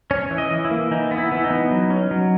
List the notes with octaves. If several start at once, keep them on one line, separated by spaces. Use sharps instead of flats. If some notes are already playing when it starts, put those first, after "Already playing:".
C#4 C#5
E3
D#5
E3
E4
A#3
E3 D#4
B3
E4
E3 E4
D#4
B3
F#3
C#4
F#3